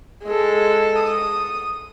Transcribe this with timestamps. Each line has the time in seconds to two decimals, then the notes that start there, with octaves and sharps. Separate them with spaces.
0.24 G#3 A4
0.99 D#6